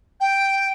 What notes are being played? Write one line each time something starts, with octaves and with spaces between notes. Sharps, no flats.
G5